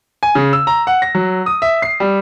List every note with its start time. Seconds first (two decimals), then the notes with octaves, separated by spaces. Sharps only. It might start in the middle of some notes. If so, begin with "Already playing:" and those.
0.23 G#5
0.35 C#3
0.53 E6
0.67 A#5
0.87 F#5
1.02 A#6
1.15 F#3
1.46 D#6
1.62 E5
1.82 C7
2.00 G3